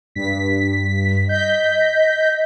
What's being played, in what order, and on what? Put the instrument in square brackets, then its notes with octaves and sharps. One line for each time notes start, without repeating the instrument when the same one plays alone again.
[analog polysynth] G2 B6
[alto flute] D#5 [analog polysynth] G6 B6